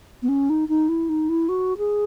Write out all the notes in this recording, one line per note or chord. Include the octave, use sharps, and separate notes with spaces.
B3
C#4
D#4
D#4
E4
D#4
E4
F#4
G#4